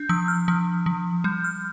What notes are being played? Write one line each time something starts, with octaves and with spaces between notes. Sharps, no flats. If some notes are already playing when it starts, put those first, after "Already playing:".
Already playing: D4 G6
F3 E6
F6
F3
F3
G3 G6
F6